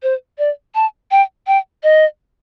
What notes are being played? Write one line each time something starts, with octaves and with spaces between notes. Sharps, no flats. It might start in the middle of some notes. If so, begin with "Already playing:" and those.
C5
D5
A5
G5
G5
D#5